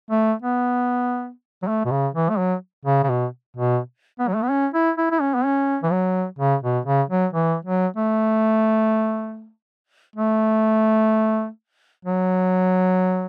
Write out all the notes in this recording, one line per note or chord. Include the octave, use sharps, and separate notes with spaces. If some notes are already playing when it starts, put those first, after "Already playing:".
A3
B3
F#3
A3
B2
C#3
E3
A3
F#3
C#3
C#3
B2
B2
B3
F#3
A3
B3
C#4
E4
E4
E4
C#4
B3
C#4
E3
F#3
C#3
B2
C#3
F#3
E3
F#3
A3
A3
F#3